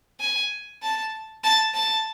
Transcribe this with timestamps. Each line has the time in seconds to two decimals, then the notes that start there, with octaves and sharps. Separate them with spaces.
0.20 G#5
0.82 A5
1.44 A5
1.74 A5